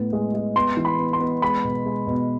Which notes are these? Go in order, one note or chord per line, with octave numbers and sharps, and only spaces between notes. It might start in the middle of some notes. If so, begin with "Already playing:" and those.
Already playing: A2 B3
G#3
G#3
B3 C6
E3
B5
B3
C6
B3
G#3 B5
B2
G#3
B2